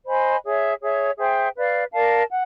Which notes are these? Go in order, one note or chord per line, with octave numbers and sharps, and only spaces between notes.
C5 D#5 G#5 B5
G#4 C#5 E5
G#4 C#5 E5
G#4 C5 E5 G5
B4 D5 F5
A#4 D5 F5 A5
F#5